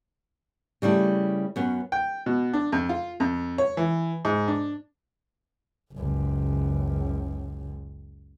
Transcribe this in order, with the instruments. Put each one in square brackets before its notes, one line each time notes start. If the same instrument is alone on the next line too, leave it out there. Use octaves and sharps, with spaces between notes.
[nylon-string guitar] C#3 G3 A3 E4
F#2 B3 C#4
[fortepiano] G5
B2
D4
F2
F4
F2
C#5
E3
G#2
D4
[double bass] F#1 C#2